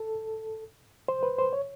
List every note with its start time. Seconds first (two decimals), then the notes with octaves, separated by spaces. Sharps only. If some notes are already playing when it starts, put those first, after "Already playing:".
Already playing: A4
1.08 C5
1.23 B4
1.38 C5
1.53 C#5